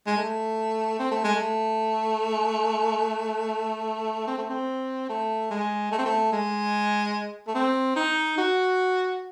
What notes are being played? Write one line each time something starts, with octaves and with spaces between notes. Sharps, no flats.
G#3
A3
C4
A3
G#3
A3
C4
A3
C4
A3
G#3
A3
C4
A3
G#3
A3
C4
D#4
F#4